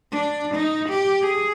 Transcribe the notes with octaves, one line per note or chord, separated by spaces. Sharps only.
D4
D#4
G4
G#4